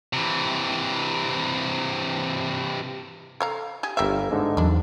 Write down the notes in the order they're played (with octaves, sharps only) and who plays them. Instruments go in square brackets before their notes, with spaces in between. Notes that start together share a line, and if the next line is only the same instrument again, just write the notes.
[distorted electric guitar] C3 E3
[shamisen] A4 F5 A#5
G4 G#4
[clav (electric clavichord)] G1 A#4 F5 [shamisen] G3 E5
[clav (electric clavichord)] G#2 D3 D#4
[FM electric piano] E2 F#3 [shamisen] A#3 D4